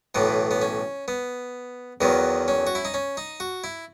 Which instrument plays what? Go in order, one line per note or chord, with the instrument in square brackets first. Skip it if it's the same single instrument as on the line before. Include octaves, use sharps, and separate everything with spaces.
[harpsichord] B1 A2 E3 B3
B3
C#4
B3
E2 D#3 F#3 B3
C#4
F#4
E4
D#4
C#4
D#4
F#4
E4